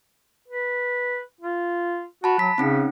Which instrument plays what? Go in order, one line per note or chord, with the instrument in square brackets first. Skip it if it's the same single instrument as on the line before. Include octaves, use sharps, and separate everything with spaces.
[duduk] B4
F4
[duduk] F#4 [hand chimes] A5 B5
[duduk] F#3 [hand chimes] B6
[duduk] C#3 [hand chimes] C4 C#4 D#4